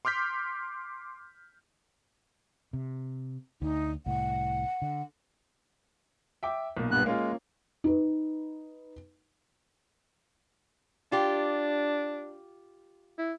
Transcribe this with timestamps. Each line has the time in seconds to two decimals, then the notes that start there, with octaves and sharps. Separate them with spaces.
0.05 C6 D6 F6 G6 B6
2.73 C3
3.62 D2 D#4
4.06 C2 A2 F#5
4.82 D3
6.43 E5 G5 D6
6.77 B1 A#2
6.91 G2 B3 F#6
7.06 G#3 A#3 C#4 F4
7.84 D#4 B4
11.12 D4 F4 G4
13.18 E4